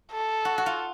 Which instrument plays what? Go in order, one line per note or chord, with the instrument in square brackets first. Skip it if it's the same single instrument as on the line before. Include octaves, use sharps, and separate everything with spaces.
[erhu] A4
[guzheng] F#4
F#4
F4